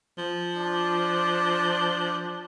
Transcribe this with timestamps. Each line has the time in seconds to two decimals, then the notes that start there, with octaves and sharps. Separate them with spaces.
0.18 F3
0.57 D4